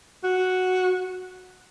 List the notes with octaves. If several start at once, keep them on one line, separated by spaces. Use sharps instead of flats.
F#4